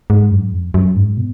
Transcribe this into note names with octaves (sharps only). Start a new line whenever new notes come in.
G#2
F#2
F2
F#2
G#2
B2